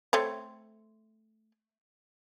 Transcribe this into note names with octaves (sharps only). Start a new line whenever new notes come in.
A3 C4 C#5